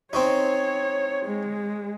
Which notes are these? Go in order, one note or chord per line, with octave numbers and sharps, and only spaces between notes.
C4 C#4 D#4 C#5
G#3